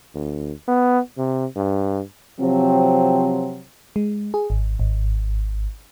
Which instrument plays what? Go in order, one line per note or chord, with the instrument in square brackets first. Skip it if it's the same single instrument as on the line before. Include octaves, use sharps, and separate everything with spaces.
[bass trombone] D2
B3
C3
G2
[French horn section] C3 F3 F#3 C4
[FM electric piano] G#3
G#4
G#1
G#1